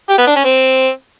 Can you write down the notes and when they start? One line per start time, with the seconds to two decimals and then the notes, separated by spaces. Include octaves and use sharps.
0.09 G4
0.18 B3
0.27 D4
0.36 C#4
0.45 C4